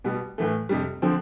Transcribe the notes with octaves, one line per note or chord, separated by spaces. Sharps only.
B2 G3 B3
A2 E3 A3
F2 C3 G3
D3 F3 C4